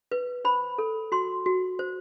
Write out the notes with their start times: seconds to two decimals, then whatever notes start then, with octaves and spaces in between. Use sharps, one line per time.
0.11 B4
0.45 C5 B5
0.78 A4
1.12 F#4 C6
1.46 F#4
1.79 C5